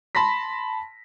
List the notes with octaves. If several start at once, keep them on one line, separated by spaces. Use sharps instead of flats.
A5 B5 C6 A#6 B6